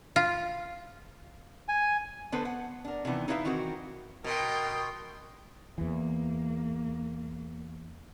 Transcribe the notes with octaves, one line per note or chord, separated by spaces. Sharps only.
F4
G#5
D3 B3 A4 B4 C5
F#5
D4 A#4
C3 D#3 E3 B3
D#4 E4 B4 D5 E5 F5
D#3 E3 C4 F#4 A#4
B2 A#4 G5 C6
E2 E3 A#3